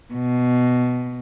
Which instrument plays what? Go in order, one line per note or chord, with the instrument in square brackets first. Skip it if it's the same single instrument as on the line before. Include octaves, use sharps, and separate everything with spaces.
[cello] B2